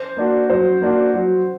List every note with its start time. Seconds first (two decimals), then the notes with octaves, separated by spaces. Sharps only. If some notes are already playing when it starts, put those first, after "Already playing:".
Already playing: C5
0.17 A#3 D4 F#4
0.50 F#3 C5
0.82 A#3 D4 F#4
1.14 F#3